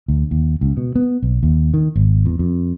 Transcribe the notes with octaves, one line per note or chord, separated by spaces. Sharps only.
D2
D#2
C#2
B2
B3
B1
D#2
D#3
G#1
E2
F2